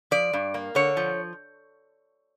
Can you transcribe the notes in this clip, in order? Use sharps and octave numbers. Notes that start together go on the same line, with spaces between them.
F3 D5
G2
A#3
D3 C#5
F3